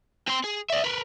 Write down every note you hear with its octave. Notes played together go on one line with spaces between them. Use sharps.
C4 C6
G#4
D5 E5
A#4 B4